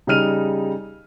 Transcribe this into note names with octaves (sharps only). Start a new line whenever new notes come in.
C#3 G3 D#4 F6 D#7 F7